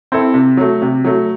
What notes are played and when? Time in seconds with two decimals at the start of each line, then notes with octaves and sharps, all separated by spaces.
0.12 C4 E4 A4
0.34 C3
0.57 F#3 A3
0.82 C3
1.05 F#3 A3